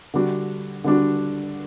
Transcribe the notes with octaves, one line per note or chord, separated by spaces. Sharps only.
D3 G3 D4 F#4
D3 G3 D4 F#4